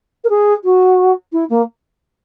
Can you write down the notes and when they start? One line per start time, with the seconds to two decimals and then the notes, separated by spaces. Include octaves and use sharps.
0.24 A#4
0.29 G#4
0.64 F#4
1.32 E4
1.49 A#3